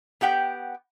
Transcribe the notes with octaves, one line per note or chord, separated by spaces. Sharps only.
B3 G4 F#5 G5